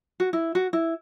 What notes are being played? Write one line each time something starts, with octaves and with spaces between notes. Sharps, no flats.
F#4
E4
F#4
E4